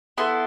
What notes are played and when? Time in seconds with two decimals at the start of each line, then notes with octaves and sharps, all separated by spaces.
0.18 B3 E4 A4 C6